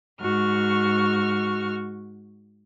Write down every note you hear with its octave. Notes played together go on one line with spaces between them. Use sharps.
G#2 F#4 C#6 F6